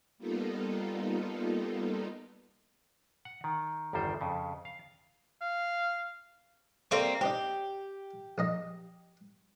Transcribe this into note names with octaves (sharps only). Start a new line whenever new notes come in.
G3 A#3 B3 D#4 F4 A4
F#5
D#3
G1 E2 D#3 G3 C5
F2 C#3
F5
F5
G3 A#3 C4 A4 C#5
C4 D4 D#4 G4
A#1 D#4 D#5